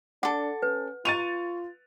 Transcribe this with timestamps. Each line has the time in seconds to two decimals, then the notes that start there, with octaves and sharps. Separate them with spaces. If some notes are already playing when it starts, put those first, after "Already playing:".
0.23 D4 A4 F#5 D6
0.62 C#4 B4
1.05 F4 C#6 A6 D#7 F7